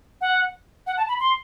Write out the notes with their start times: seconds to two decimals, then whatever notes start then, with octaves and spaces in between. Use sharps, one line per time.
0.21 F#5
0.87 F#5
0.97 A5
1.08 B5
1.20 C6